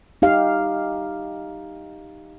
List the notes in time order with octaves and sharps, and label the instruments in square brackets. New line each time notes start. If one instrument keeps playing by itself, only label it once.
[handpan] D#4 G4 F5